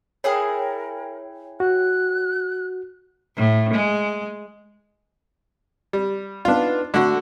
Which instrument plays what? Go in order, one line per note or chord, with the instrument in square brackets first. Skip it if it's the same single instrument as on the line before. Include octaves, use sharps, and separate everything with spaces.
[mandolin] E4 G#4 D#6 [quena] A#4 [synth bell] C#5 G5
[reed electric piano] F#4 [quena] F#6
[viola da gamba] A2
G#3
[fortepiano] G3
[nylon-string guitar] B3 D#4 [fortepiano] D4 F4
[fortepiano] D3 F#4 [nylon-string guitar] A3